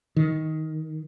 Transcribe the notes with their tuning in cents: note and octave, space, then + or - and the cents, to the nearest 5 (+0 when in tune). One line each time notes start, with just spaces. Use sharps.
D#3 +15